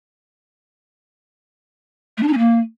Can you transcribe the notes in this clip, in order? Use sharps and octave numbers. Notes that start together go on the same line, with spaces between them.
A3
D4
D#4
C#4
A#3